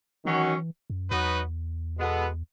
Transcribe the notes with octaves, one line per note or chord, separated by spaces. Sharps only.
D#3 E3 F#3 C#4 F#4
F#2
E2 F#3 B3 D#4 F#4 B4
B2 G#3 B3 F#4 A4